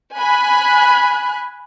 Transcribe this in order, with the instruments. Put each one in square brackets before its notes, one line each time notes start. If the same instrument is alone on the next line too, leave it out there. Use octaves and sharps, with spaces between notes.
[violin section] G#5 B5 F#6